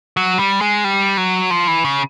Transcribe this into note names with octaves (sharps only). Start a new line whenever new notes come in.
F#3
G3
G#3
G3
F#3
F3
E3
C#3